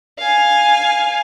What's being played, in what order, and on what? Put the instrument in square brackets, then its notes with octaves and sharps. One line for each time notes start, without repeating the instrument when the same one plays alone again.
[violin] F5 G#5